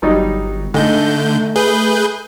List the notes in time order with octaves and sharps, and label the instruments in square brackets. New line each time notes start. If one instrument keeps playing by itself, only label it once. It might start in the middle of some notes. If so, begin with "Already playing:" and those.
[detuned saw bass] G1 [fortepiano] F#3 G3 D#4
[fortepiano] G#2 [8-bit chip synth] D3 G6 [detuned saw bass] A3
[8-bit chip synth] G#4 B4 G6